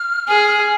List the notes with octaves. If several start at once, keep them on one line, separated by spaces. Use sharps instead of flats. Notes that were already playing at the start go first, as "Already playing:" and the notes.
Already playing: F6
G#4